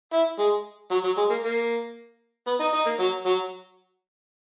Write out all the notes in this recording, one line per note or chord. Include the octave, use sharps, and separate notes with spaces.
E4
G#3
F#3
F#3
G#3
A#3
A#3
B3
D#4
D#4
A#3
F#3
F#3